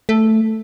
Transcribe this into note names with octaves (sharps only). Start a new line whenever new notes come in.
A3